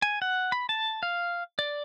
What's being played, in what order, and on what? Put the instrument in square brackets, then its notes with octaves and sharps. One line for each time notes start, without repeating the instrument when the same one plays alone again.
[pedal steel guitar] G#5
F#5
B5
A5
F5
D5